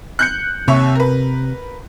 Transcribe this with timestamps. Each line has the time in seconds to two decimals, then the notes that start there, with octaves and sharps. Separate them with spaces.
0.19 F#6 G6 C#7
0.68 D#2 C3 C#5 E5
0.95 A#4 B4